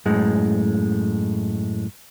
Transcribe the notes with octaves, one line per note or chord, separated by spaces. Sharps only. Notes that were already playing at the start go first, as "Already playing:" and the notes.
F#2 A2 G#3